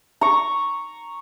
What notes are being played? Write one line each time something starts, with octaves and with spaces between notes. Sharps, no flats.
A#5 C#6